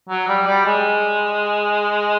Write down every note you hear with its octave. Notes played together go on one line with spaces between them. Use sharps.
F#3
G3
G3
G#3